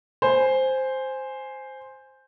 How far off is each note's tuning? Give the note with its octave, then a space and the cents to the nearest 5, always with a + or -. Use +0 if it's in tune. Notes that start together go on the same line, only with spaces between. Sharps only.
C5 +0 G#5 +0